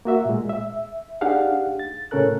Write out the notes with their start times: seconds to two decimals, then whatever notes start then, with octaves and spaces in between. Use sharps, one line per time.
0.05 A#3 F#4 E5
0.25 A#2 G#3
0.49 E5
1.21 D4 D#4 G4 G#4 F5 F#5
1.79 A6
2.11 A2 C#3 C#4 A4 A#4 F#6